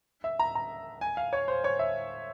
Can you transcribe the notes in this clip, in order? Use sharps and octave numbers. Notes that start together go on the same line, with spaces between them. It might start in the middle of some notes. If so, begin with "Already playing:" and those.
E5
A#5
A#5
G#5
F5
C#5
C5
C#5
E5